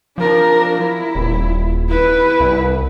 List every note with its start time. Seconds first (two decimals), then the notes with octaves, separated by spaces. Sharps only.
0.18 F3 D4 A#4
0.82 E4
1.15 D#1
1.89 E4 B4
2.40 C2